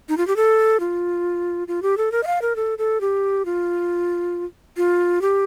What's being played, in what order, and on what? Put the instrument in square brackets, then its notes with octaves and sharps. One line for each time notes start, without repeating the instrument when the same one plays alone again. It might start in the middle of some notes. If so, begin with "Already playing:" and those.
[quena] D#4
F4
G4
A4
F4
F4
G4
A4
A#4
D#5
F5
A#4
A4
A4
G4
F4
F4
G4